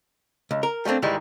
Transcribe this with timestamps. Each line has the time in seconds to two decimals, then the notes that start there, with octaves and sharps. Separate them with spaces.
0.51 C#2
0.63 A#4
0.85 G3 A3 A#3 C4 D4
1.02 G#2 D#3 E3 G3 G#3